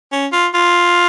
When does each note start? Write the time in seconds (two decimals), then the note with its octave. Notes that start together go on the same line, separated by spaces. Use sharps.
0.12 C#4
0.33 F4
0.54 F4